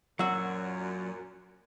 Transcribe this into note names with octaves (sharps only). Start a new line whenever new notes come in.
F#2 A#2 F#3 F#4 F#5 E6